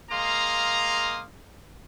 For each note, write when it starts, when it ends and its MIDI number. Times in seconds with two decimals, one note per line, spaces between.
0.11 1.23 56
0.11 1.23 58
0.11 1.23 77
0.11 1.23 82
0.11 1.23 84
0.11 1.23 87